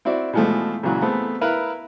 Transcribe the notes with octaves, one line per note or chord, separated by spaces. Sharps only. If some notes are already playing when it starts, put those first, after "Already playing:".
C4 E4 F#4 D5 E5
B2 E3 F3 G#3 A3
A#2 C#3 E3 F#3
A3 B3 C4 G#4 A4
E4 A#4 B4 F5